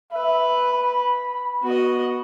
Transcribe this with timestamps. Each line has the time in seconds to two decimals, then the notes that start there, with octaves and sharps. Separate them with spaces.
0.12 B4 E5
0.69 B5
1.63 B3 F#4 D#5